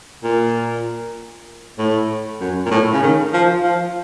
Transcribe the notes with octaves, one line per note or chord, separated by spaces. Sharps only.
A#2
A2
F#2
A#2
A2
C#3
D#3
F3
F3